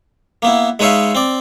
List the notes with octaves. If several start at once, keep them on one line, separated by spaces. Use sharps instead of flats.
A#3 B3 E4
G#3 D#4 B4 C#5 E5 F5
C4 D5